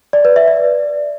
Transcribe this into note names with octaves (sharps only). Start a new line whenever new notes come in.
D5
B4
E5
D5